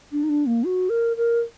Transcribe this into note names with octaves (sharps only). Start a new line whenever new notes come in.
D4
D#4
D4
A#3
F#4
A#4
A#4